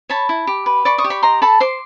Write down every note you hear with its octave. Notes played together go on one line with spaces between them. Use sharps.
C#5 A5 B5
E4
G4
B4
D5 B5 C#6
C#6 D#6
G4
B5 C#6
D#5 A#5 C6
A4 A5 B5
C5 C6 D6